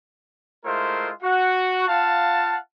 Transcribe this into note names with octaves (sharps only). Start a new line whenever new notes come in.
G#3 A3 E4 F4 A#4 C5
F#4 F#5
F4 F5 F#5 A5